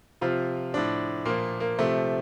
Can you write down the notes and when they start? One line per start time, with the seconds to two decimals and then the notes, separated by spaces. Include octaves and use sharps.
0.21 C3 F3 F4
0.73 A2 F3 D4
1.25 A#2 F3 A#3
1.60 A#3
1.79 C3 F3 A3